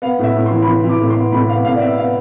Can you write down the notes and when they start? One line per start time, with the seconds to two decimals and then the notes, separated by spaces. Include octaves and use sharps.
0.02 B3 F5
0.19 A2
0.24 E5
0.35 A2
0.46 C6
0.51 E3
0.62 B5
0.68 E3 C6
0.84 E3
0.89 D6
1.00 A2
1.10 C6
1.16 B3
1.32 A2 B5
1.49 B3 F5
1.65 A2 F5
1.76 D5
1.81 B3 E5
1.98 B3 F5